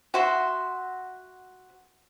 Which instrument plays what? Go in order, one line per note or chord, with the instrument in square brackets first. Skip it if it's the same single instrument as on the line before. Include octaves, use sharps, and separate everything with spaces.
[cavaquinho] F#4 E5 C6